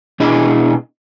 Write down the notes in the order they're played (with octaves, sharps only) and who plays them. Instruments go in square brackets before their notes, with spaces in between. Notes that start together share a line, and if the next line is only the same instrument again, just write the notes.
[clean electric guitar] B2 D4 E4 G#4 D#5 B5